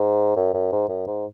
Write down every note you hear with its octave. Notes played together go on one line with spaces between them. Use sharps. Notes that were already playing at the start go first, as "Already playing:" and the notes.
Already playing: G#2
F#2
F#2
G#2
F#2
G#2